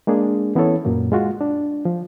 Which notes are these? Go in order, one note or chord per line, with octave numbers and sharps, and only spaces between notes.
G#3 A#3 D4 G#4
E3 B3 C#4 E4 A4 C#5
F#2 A#2 F#3 A#3
G#3 F4 F#4
D4
F3